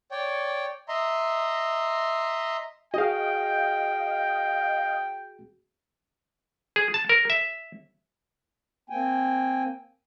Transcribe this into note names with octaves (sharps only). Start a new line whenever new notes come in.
C#5 D5 G5
D#5 E5 A#5 C6
F#4 G#4 D#5 F5 G5
G#4
A5
A#4
E5
A#3 C4 G5 G#5